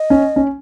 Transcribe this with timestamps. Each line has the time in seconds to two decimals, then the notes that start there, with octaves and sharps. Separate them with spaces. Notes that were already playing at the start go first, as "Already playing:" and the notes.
Already playing: D#5
0.10 C#4
0.36 C#4